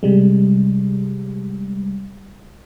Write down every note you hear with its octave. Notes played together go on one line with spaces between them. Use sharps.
C3 G3 G#3